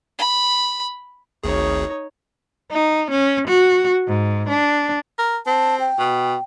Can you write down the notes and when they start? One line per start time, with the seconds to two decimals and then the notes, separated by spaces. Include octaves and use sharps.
0.19 B5
1.44 G#1 D2 D#4 G#4 C#5
2.71 D#4
3.11 C#4
3.48 F#4
4.08 G#2
4.49 D4
5.18 A#4
5.47 C4 A5
5.80 G5
5.99 B2